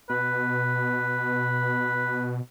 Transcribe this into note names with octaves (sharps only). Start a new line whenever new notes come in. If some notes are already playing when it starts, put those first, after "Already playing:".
B2 B4